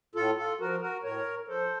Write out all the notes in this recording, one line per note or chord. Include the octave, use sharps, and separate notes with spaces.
A2 F4 A4
F4 A4
F3 F#4 A#4
F#4 A#4
A2 A#4 C#5
F3 A4 C5